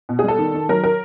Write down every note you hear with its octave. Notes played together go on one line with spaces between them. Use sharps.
B2
G#4
G3 A4
D#3
D#3
F#3 A#4
A#4